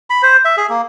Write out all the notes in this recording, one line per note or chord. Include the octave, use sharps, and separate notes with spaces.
B5
C5
E5
G#4
A#3